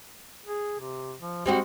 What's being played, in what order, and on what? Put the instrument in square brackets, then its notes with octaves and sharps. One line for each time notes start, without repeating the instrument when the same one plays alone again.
[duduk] G#4
C3
F3
[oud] G3 C4 F#4 [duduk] G#3